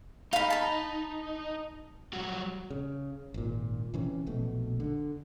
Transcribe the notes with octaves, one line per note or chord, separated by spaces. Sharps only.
D#4 F5 B5
A5 B5
F#3 G3 F#4
C#3
G#1 A#2
C3 E3 C#4
A#1 B2 A3
D3